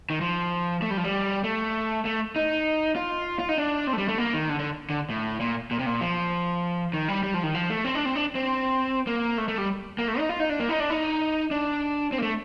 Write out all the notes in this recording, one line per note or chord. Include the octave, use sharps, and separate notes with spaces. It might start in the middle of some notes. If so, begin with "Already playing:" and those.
D#3
F3
A3
G3
F3
G3
A3
A3
D#4
F4
F4
D#4
D4
C4
A3
G3
A3
A#3
D#3
D3
D3
D3
A2
A#2
A#2
C3
A#2
F3
D#3
G3
G3
F3
D#3
F3
A3
C4
D4
C4
D4
C4
A#3
A3
A3
G3
A#3
A3
D#4
F4
D#4
D4
A#3
D#4
D4
D#4
D4
C4
A#3
A3